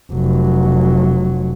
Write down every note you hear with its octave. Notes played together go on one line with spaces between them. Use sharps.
F1 F#3